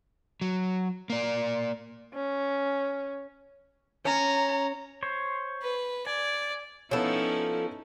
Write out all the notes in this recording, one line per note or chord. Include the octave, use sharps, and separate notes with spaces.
F#3
A#3 D5
C#4
C#4 A#5
C5 C#5
B4
D5 G#5
F3 B3 C#4 D#4 E4 A4 C#5